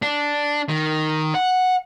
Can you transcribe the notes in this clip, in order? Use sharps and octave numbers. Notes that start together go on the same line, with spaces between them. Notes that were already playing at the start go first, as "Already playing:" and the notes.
D4
D#3
F#5